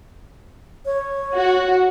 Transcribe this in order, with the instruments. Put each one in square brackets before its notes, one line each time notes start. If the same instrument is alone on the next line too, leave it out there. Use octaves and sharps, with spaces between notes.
[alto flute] C#5
[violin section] F#4